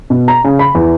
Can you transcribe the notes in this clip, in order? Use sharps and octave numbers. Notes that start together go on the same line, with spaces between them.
B2
A#5
C#3
B5
E2